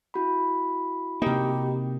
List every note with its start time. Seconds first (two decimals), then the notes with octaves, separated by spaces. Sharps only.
0.14 E4 F#4 B5
1.22 C3 A#3 D#4 G4